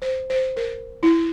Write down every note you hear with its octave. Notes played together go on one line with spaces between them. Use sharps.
C5
C5
A#4
E4